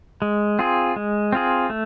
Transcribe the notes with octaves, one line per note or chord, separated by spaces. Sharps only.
G#3
C4 F4 G#4
G#3
C4 F4 G#4
A3